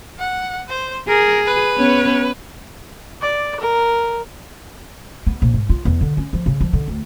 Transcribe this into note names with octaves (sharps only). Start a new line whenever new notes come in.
F#5
C5
G#4 A#4
B4
B3 C#4 C#5
D5
A#4
B3
A#1
G#2
F4
E2
D3
C#4
F3
C#3
F3
D3
D2